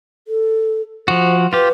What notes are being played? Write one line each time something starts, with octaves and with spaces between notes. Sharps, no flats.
A4
F3 F#4 C5
F4 G4 B4